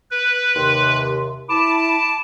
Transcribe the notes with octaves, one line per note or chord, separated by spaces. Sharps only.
B4
D#2 C3 C6
E4 A5 B5 D6